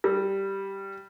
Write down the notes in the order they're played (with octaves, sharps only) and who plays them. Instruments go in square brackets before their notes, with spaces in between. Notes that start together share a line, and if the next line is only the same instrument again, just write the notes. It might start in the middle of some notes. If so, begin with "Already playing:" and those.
[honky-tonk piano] G3